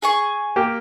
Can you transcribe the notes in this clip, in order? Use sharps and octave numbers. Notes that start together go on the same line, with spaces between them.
G#4 G#5 C#6
A#3 G4